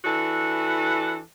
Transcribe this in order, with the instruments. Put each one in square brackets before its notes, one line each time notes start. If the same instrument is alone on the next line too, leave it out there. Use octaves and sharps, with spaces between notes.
[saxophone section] E3 D4 F#4 A4